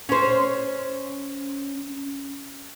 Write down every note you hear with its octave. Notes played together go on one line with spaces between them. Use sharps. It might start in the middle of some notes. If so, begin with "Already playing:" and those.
C#4 C5